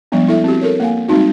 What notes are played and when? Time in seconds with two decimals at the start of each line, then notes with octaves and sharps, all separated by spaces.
0.12 F3 G3 G#3 B3 D4
0.28 E4 A4 E5
0.44 C4 F#4 G4
0.61 A4 A#4 C#5
0.80 A#3 F5 G#5
1.08 G3 G#3 C4 D#4 F#4